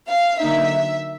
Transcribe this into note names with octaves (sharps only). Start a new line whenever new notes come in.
F5
D3 F#3 A#3 D#4 E5